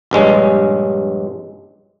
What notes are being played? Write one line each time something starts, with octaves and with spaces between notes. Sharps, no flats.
A#1 G2 G#3 C#4